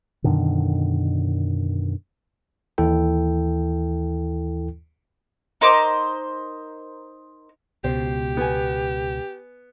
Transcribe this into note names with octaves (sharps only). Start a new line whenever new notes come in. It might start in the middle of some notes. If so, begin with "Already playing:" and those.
F#2 B2 D3 D#3
D#2 E3 E4 A4 G5
D#4 A#4 C5 D6
C#2 B2 G4 C5
B3 G#5